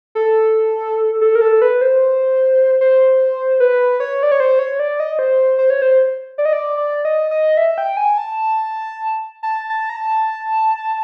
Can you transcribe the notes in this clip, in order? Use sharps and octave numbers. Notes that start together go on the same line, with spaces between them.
A4
A4
A#4
A4
B4
C5
C5
B4
C#5
D5
C#5
C5
C#5
D5
D#5
C5
C5
C#5
C5
D5
D#5
D5
D5
D#5
D#5
E5
G5
G#5
A5
A5
A5
A#5
A5